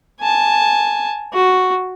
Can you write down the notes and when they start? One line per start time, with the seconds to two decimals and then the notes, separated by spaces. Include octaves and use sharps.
0.20 G#5 A5
1.33 F#4